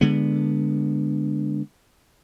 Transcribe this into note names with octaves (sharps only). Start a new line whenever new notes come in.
D3 G#3 B3